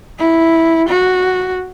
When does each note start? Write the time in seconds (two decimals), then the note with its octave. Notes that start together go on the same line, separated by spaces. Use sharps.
0.19 E4
0.89 F#4